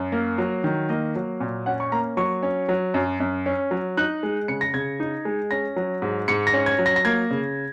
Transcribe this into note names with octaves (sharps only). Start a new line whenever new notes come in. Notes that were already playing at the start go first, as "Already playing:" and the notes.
Already playing: F#2
A#3
F#3
D#3
A#3 D#5
F#3
A#2
C#4 F#5
C#6
A#3 A#5
F#3 C#6
C#4
F#3
F#2
F#2
C#4
F#3
D#4 F#6
G#3
C#3 C#7
A#6
C#3 G#6
D#4
G#3
C#4 A#6
F#3
G#2
G#2 C#7
A#6
C#4
G#6
F#3
A#6
A#6
A#3 G#6
C#3